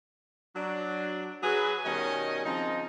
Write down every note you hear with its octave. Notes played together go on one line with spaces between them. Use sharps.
F#3 D4
F#3 G#4 B4
B2 D#3 G3 C#4 D#5 G#5
C#3 F3 C4 D#4